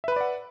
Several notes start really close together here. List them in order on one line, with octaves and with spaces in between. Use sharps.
E5 B4 B5 D5 F#5